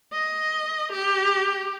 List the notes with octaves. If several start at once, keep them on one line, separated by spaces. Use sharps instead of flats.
D#5
G4